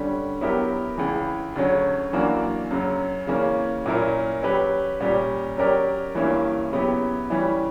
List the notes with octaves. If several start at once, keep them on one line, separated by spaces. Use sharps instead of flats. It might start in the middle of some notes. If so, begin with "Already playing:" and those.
Already playing: D3 G3 C#4
F#3 B3 E4 G4 A#4
C#2 C#3 E3
D2 C#3 F#3 C#4
F#2 E3 A#3 D4 F#4
F#2 C#3 F#3
C#3 E3 A#3 C#4
A#2 F#3 C#4 E4 A#4
F#3 C#4 G4 B4
A#2 G3 C#4 G4
F#3 C#4 G4 A#4 D5
G2 E3 A#3 C#4 E4
C#3 F#3 B3 E4 G4
E3 G3 C#4 E4